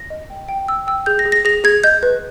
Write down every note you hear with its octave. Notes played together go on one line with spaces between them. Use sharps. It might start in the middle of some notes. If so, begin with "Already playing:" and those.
Already playing: A#6
D#5
G5
G5
G5 E6
G5 E6
G#4 G6
A#6
G#4
A#6
G#4 A#6
G#4 G#6
D#5 G6
B4